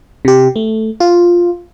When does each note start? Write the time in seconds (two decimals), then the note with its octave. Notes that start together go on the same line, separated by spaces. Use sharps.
0.25 C3 G4
0.56 A3
1.00 F4